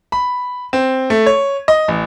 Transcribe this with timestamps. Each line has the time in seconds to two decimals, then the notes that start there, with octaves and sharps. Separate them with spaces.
0.12 B5
0.73 C4
1.10 A3
1.26 C#5
1.68 D#5
1.88 A1